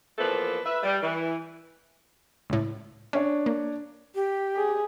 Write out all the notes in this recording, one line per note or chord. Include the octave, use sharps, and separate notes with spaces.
E2 F3 A#3 A4 B4
B4 E5
G3
E3
C#2 A2
C#4 D4 C#5
A#3
G4
G#4